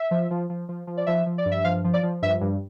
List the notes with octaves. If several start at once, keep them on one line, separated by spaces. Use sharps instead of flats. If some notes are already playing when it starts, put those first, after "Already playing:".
Already playing: E5
F3
F3
F3
F3
F3
D5
F3 E5
F3
D5
G2
E5
F3 F5
F3
D5
F3
G2 E5
G2